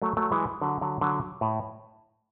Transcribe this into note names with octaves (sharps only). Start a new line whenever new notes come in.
F#3 A3
F#3 A3
E3 G#3
D3 F#3
D3 F#3
D3 F#3
A2